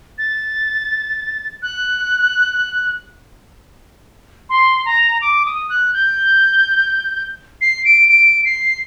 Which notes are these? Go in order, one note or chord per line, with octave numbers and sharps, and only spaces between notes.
A6
F#6
C6
A#5
D6
D#6
F#6
G6
C7
D7
D7
C7